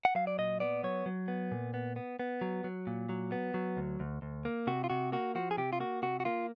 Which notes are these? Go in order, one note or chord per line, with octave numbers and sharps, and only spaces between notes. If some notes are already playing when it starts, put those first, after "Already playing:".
F#5
F#3 F5
D5
A#2 D#5
B3 D5
F#3 C#5
F#3
B3
A#2
B3
B3
B3
F#3
F#3
A#2
F#3
B3
F#3
D2
D2
D2
A#3
C3 F#4
F4
C3 F#4
A#3 F#4
F3 F#4
G#4
C3 G4
F4
A#3 F#4
C3 F#4
F#4
A#3 F4